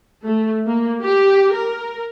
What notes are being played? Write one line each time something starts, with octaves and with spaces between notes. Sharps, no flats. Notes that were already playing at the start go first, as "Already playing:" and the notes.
A3
A#3
G4
A#4